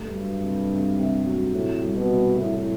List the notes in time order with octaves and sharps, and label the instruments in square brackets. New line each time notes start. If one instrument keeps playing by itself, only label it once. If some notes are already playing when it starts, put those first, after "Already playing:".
Already playing: [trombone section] G2 [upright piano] A3
[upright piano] F#3
C3
C3
C3
F#3
[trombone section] A2 [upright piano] C3
[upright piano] G3
[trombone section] B2
[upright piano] C2
[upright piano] C2 [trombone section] A2